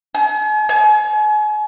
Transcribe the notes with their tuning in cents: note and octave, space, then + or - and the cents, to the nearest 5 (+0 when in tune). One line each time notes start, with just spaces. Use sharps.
G#5 +45
G#5 +40